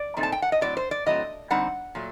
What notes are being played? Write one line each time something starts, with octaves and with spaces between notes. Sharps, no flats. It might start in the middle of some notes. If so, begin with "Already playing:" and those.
Already playing: D5
A#2 A3 C4 D#4
A5
G5
F#5
D#5
A2 F#3 C4 D5
C5
D5
A2 F#3 A3 C4 D#5
D3 G3 C4 D#4 F#5
A#2 F#3 A3